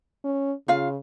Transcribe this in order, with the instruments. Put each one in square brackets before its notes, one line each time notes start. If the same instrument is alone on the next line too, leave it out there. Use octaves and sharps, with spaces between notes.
[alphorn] C#4
[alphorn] C#3 [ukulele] F4 F5